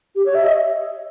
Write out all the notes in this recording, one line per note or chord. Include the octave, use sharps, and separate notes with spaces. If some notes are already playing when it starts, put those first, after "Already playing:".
G4
C#5
E5
D#5